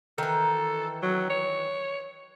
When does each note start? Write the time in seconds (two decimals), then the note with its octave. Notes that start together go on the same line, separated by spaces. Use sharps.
0.18 D#3 E3 A4
1.03 F#3
1.30 C#5